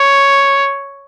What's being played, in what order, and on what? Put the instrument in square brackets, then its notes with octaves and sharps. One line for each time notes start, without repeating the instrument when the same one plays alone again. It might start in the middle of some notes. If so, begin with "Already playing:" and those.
Already playing: [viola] C#5